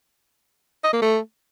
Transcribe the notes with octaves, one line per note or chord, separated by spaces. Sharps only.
D#5
A#3
A3